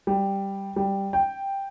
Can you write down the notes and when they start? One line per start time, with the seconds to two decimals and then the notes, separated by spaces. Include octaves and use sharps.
0.07 G3
0.76 G3
1.13 G5